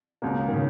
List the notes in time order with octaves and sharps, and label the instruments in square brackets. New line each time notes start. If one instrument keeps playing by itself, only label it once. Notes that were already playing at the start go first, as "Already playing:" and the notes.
[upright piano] C#2 B2 A#3
[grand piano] D#3
C#3